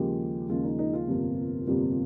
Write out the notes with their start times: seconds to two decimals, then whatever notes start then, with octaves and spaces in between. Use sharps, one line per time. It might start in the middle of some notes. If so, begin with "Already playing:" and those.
Already playing: D#2 C#3 F3 G#3 G4
0.49 D#2 C#3 F3 G#3 F4
0.64 D#4
0.79 D#4
0.94 F4
1.08 G1 F2 C3 G3 A#3
1.67 G1 F2 C3 G3 A#3